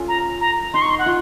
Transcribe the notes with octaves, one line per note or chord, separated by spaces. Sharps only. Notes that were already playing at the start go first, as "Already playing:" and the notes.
Already playing: C#4 F4 A4
A#5
A#5
D#4 C6
C#6
C6
F#5
F4